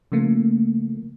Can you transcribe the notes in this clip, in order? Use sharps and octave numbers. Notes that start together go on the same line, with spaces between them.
C#3 F3 A3 A#3